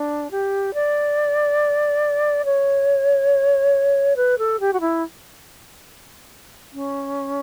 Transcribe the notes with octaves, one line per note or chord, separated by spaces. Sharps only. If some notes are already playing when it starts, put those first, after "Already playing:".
Already playing: D4
G4
D5
C#5
B4
A4
G4
F#4
E4
C#4